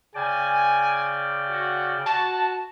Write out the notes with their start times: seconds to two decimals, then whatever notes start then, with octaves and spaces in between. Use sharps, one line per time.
0.15 C#3 D5 G5 G#5
1.50 F#4
2.06 F#4 A5